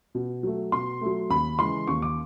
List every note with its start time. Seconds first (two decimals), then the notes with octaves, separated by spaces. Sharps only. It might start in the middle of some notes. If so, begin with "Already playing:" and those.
0.15 B2
0.43 F#3 A3
0.72 B2 C6
1.01 F#3 A3
1.30 D#2 B5
1.58 C#3 E3 G#3 C6
1.87 D#2 C#6
2.02 D6